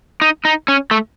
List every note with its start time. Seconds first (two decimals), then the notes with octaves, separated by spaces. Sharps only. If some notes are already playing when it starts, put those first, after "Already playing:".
0.21 D#4
0.45 D#4
0.68 C#4
0.91 A3